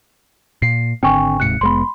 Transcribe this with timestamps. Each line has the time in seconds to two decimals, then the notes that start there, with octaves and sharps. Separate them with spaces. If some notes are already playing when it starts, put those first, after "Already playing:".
0.62 A#2 C7
1.03 G#1 D3 C4 G5 G#5 C#6
1.40 D1 G#2 C3 F#6 C#7
1.61 F1 G#3 B3 B5 C6